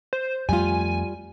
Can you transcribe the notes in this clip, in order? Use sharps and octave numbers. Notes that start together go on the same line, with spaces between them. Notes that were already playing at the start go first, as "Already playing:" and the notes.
C5
F2 G3 A3 F4 G#5